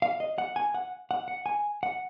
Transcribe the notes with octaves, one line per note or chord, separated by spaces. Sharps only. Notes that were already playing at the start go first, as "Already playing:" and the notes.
F5
D#5
F#5
G#5
F#5
F#5
F#5
G#5
F#5